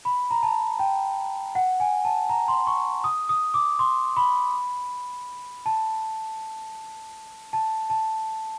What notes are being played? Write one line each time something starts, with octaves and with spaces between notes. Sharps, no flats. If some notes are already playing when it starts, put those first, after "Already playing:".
B5
A#5
A5
G5
F#5
G#5
A5
A#5
C6
C#6
D#6
D#6
D6
C6
B5
A5
A5
A5